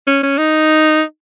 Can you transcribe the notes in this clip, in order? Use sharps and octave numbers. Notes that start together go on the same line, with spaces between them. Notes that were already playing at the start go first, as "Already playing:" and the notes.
C#4
C#4
D#4